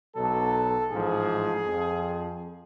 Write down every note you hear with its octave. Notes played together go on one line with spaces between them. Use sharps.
B1 B2 F#3 A4
A1 G#2 F3 G#4
F2 F3